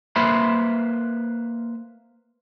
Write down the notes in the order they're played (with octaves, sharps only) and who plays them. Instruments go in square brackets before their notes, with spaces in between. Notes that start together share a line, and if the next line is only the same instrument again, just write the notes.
[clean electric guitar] A#3 B4 C5 E5 B5 C6